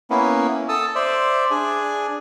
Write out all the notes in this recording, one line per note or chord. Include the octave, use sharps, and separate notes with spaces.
A#3 B3 C#4 E4
A4 A5 D#6 E6
C5 D5 E5
D4 G#4 G#5